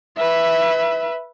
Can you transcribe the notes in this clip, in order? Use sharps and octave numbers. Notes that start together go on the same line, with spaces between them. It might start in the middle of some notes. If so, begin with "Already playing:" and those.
B4 E5